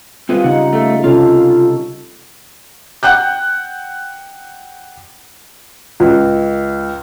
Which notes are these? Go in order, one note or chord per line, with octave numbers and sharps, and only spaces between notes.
G3 C4 F4 G#4 B4
C#3 D#4 F#5
A3
C3 C#4 F4 A4
F#5 G5 F#6 G6
C#2